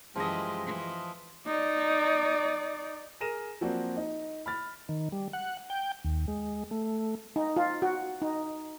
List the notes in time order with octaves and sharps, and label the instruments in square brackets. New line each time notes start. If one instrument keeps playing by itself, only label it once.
[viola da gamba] F#2 E3 G4 [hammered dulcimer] F3 D#5 [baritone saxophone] G#3
[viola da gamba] E3
[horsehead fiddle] D#4 D5
[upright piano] G#4 A#4 A#6 D#7 E7
F3 F#3 A#3 C4 F#4 D5
D#4
B5 F6 A6
[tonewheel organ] D#3
G3
F#5
G5
D#2
G#3
A3
[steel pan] D#4
F4
F#4
D#4